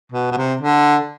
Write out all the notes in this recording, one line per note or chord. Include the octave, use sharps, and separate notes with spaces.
B2
B2
C3
D3